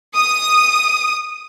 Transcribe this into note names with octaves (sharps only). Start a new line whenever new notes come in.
D#6